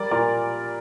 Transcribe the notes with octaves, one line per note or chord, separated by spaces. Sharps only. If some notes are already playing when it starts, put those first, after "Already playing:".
Already playing: G3 A#4 D5
A#2 A#4 D5